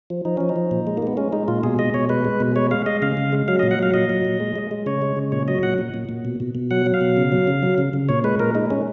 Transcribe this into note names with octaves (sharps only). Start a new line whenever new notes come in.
F3
F3 D#4
F3 C#4
D#4
F3
A#2
G#3
A#3
G#3 B3
G#3 C#4
G#3 D#4
A#2 F4
B2 G#4
G#3 D#5
B2 C#5
G#3 B4
G#3
B2
G#3 C#5
G#3 F5
G#3 D#5
C#3 F5
C#3
G#3
F#3 F5
D#5
A#2
F#5
F#3 F5
A#2 D#5
F#3
A#2
G#3
G#3
G#3
C#3 C#5
G#3
C#3
A#2 C#5
F#3 D#5
A#2 F#5
A#2
A#2
A#2
B2
B2
B2
F#3 F#5
F#3
F5
B2
C#3
F#3
C#3
F#3
C#3
C#3
A#2 C#5
G#3 B4
A#2 A#4
G#3 D#4
G#3 C#4